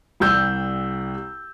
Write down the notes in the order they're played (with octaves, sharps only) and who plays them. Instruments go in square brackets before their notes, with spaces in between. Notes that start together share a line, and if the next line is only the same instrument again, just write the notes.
[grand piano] C2 G3 E6 G6